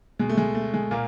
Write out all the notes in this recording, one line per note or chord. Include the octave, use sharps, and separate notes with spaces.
B2 G#3
A3
G#3
A3
G#3
A#2 A#3